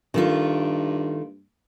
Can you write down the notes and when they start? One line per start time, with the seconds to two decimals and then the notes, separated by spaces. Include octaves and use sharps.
0.14 G2 D#3 A3 F4